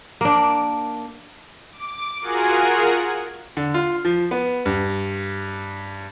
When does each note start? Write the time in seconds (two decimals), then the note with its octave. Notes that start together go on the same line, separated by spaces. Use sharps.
0.21 A#3 D4
1.73 D6
2.21 F4 F#4 G#4 A#4 F#5 G#5
3.57 D3
3.74 F4
4.05 F3
4.31 B3
4.66 G2